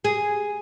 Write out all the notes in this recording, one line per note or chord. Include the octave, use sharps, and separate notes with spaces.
G#4